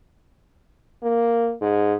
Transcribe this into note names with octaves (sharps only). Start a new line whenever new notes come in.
A#3
G#2